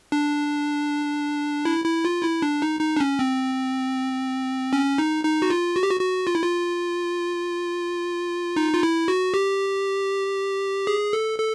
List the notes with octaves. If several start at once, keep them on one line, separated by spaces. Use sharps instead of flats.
D4
E4
E4
F4
E4
D4
D#4
D#4
D4
C#4
C4
C#4
D#4
D#4
F#4
F4
F#4
G4
F#4
F#4
F4
E4
F4
D#4
F4
E4
F#4
G4
G#4
A4
A4